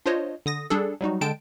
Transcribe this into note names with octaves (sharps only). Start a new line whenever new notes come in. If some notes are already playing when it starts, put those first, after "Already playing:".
D4 F4 C5 C#5 D#5
D3 D#6 A#6
G3 D4 G#4 A4
F#3 G3 D#4 F#4
D3 G#3 G5 A5 D7